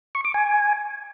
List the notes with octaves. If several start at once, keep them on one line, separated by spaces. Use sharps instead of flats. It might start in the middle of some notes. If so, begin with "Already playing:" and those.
C#6
D6
G#5